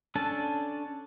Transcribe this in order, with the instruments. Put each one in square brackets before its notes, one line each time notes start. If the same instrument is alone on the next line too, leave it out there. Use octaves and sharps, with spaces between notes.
[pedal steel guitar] C#4 D4 A4 A5